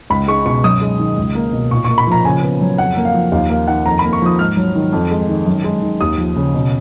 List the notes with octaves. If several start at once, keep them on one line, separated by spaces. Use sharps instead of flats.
C#2 B5
G#3 C#6
B2 C#6
F#2 D#6
G#3
D#3
C#2
A#3
B2
A#2 C#6
A#3 C#6
B5
F3 A#5
C#3 G#5
B3
F#3
F2 F#5
A#3
F5
F3
D#2 F5
A#3 F5
D#3 F#5
F2 A#5
A#3 B5
C#6
F3 D#6
G#2 F6
F#3
D#3
F2
G#3
D#3
F#2
G#3
D#3
D#2 D#6
F3
C#3
B2